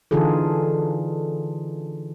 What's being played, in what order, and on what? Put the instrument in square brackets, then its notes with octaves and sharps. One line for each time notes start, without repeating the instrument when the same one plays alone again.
[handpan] D3 E3 D#4 F4 G#4 A4